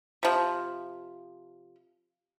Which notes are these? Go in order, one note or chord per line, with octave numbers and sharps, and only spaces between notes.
C3 F3